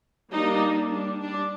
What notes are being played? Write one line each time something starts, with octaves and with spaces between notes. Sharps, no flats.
G3 A#3 D4 D#4
G3 D4
D4